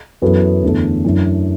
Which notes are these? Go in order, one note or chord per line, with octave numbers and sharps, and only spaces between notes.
F#2 E3 B3 F#4 A4
E2 D3 A3 E4 A4
F#2 E3 D4